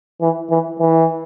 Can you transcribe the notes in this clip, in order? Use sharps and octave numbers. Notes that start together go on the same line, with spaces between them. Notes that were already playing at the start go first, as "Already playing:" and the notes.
E3
E3
E3